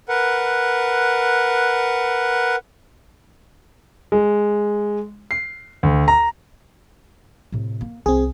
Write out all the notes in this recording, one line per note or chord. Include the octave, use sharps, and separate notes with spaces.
A#4 B4 F#5
G#3
C7
D2
A#5
A2 C3
A#3
C2 C4 G#4